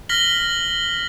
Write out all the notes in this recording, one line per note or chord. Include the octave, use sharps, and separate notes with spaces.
F6 A#6 B6 F#7 G7